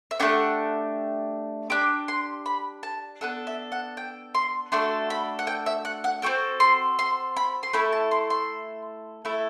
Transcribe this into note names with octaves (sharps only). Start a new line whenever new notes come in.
E5
A3 D4 G4 F#5
D4 G4 D6
C6
B5
A5
B3 D4 A4 F#5
E5
F#5
G5
C6
A3 D4 F#4 A4 C6
B5
F#5
G5
E5
F#5
F#5
C4 F#4 A4 G5
C6
C6
B5
C6
A3 E4 A4 B5
A5
C6
C6
A3 E4 A4